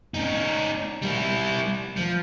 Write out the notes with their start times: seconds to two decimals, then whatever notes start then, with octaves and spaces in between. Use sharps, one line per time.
0.14 C#4 D#4
1.02 G3 E4
1.97 F3